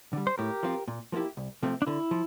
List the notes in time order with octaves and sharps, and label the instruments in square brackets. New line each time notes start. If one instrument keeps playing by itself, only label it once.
[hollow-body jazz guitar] D3 G3
[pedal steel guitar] C5
[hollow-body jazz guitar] A2 [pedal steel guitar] G4 A#4
[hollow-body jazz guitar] F3 C4 F4
A#2
F3 A#3 E4 G4
C2
C3 F3 A3 C4
[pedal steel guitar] D4
[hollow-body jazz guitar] D3 [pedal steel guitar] E4
[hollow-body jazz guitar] F3